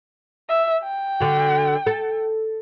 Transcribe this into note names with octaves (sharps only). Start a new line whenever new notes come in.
E5
G5
D3 F#4
A4